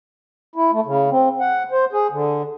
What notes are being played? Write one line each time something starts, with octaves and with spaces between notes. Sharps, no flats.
E4
A3
C#3
C4
F#5
C5
G#4
D3